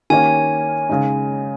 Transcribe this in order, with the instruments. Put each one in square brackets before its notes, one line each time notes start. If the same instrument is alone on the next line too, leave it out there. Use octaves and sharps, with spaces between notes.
[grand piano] D#3 A#3 C#4 G4 C#5 [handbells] G#5
[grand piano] C#3 G#3 D#4